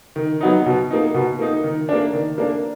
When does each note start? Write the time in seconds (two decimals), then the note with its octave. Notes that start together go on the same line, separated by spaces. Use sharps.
0.16 D#3
0.41 F#3 B3 D#4
0.66 B2
0.91 A#3 D#4
1.14 B2
1.39 A#3 D#4
1.64 D#3
1.89 A#3 D4
2.13 D#3
2.38 A#3 D4